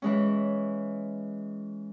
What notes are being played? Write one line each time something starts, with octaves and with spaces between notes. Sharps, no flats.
E3 G#3 C#4